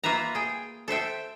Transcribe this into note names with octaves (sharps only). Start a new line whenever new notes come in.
A#3 F4 B4 E5 A#5
G#4 G5
A4 C5 E5 G5